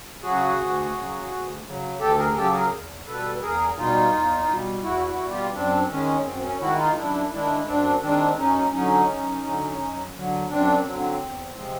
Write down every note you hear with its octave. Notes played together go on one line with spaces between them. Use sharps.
C#3 F#3 F#4 G#4
D2
C#3 F#3
D2
C#3 F#3
D2 G4 A4
G#4 A#4
G#4
C#3 F#3 G4 A4
G#4 A#4
E2
B2 G3 A4 B4
E2 G#4 A#4
B2 G3 D#4 F4
E2
B2 G3
E2 E4 F#4
E4 F#4
B2 G3
F4 G4
F#2 C4 D4
D#3 G#3 C#4
F#2 C4
C#4
D#3 G#3 E4 F#4
D#4 F4
F#2 D4 E4
D#3 G#3 D4 E4
F#2 C4 D4
D#3 G#3 C4 D4
F#2 C#4 D#4
D3 F#3 C#4 D#4
F#2
D3 F#3
F#2
D3 F#3
F#2 C4 D4
D3 F#3 C4
E2
C3 F3 G#3